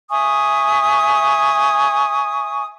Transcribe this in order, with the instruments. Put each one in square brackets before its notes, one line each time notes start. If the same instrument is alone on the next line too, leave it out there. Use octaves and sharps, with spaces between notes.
[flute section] E5 G#5 C#6 D#6